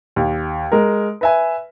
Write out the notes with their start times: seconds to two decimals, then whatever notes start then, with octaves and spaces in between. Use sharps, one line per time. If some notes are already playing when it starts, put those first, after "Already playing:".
0.16 D#2
0.72 G#3 A#4
1.21 B4 E5 G#5